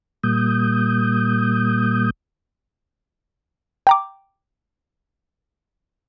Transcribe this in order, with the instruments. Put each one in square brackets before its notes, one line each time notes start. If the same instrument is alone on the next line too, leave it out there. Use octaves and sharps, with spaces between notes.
[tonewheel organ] A#2 G3 A#3 D#6 G6
[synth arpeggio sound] G5 A#5 D6